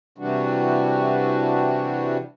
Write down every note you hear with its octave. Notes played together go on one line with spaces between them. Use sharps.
C3 E3 G3 D4 F#4